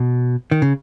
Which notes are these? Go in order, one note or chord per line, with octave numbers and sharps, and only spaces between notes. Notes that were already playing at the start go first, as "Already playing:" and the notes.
Already playing: B2
D#3
C#3